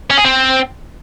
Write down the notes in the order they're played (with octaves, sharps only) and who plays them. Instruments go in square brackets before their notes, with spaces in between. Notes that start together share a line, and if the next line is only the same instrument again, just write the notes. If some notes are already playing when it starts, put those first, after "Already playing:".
[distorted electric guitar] C#4
G#4
C4